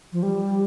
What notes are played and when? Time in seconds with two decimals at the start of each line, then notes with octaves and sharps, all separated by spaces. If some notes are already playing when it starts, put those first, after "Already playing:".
0.13 F3
0.23 G3